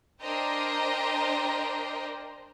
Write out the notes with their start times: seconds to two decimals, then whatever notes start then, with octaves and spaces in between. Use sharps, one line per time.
0.21 D4 A#4 C5 D#5 G5 A#5